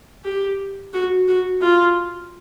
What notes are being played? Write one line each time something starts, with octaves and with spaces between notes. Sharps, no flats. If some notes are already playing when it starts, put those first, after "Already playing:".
G4
F#4
F#4
F4